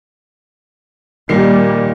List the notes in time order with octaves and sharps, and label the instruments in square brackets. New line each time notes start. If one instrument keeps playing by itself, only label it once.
[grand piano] A#2 D#3 C7 [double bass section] G3 A#3